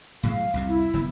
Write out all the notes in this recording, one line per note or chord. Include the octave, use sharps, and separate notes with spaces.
A2 F#3 G#3 F5
C2 F2 C3
E4
F#1 F#3 B3